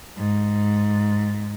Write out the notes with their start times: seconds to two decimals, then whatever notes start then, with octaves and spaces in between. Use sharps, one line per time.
0.18 G#2